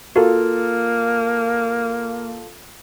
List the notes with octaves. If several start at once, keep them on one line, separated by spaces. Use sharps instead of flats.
A#3 F4 F#4 A4 A#4